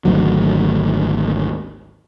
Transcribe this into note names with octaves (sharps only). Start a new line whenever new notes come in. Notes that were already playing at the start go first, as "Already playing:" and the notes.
G#1 D2 F#3